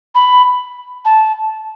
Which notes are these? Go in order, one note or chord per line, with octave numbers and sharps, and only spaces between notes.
B5
A5